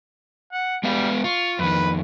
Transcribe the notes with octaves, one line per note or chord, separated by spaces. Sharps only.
F#5
G3 G#3 B3 F5
F4 C#6
F2 D#3 B4